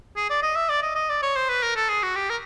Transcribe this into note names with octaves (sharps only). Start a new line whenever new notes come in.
G#4
D5
D#5
E5
D5
D#5
D#5
D5
C#5
C5
B4
A#4
A4
G#4
F#4
G4
A#4